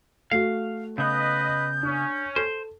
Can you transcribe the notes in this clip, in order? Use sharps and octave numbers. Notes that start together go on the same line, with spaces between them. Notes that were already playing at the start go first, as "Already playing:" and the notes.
A3 F#4 F5
C#3 B3 B4 D#5 G6
C#4 D4
A4 C5